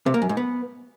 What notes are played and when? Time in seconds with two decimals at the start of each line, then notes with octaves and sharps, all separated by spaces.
0.06 C3
0.14 A#3
0.22 F#2
0.29 G#2
0.37 B3